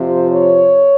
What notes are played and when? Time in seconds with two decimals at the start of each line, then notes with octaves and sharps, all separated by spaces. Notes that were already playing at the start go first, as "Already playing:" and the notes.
Already playing: F2 C3 F3 C5
0.30 C#5